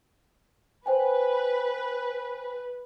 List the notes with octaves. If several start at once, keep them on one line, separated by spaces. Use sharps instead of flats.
B4 C5 G5 G#5